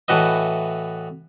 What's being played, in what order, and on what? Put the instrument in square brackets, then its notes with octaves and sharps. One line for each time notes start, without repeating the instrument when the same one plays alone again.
[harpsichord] A2 E3 F#4 B4 D#5